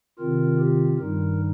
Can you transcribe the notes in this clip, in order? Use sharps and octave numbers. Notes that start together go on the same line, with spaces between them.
C3 D#3 C4 F4 A#4
G4
G2 D#3 G3 D#4 A#4